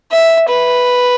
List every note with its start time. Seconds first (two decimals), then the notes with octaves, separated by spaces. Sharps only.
0.11 E5
0.49 B4